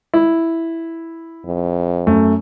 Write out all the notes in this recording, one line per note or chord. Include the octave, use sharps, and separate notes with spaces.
E4
F2
F#2 A3